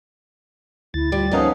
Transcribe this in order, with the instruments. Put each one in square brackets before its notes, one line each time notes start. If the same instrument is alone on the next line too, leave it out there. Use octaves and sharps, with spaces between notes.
[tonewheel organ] D2 A6 [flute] E4
[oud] G3 [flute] F4
[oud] F3 D#4 [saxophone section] A#3 B3 C#4 [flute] D#6